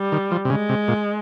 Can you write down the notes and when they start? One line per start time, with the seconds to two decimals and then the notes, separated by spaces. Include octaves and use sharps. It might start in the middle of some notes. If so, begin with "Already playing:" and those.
Already playing: G3
0.12 D#3
0.31 F3
0.45 C3
0.50 C#3 G#3
0.69 C3
0.88 A#2